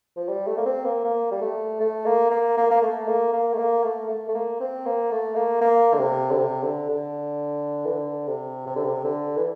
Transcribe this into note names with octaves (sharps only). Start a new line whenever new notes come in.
F3
G3
A3
A#3
C4
A#3
A#3
G3
A3
A3
A#3
A#3
A#3
A#3
A3
A#3
A#3
A3
A#3
A3
A3
A3
A#3
C4
A#3
A3
A#3
A#3
D3
C3
D3
C3
D3
D3
E3
D3
C3
C3
D3
C3
D3
E3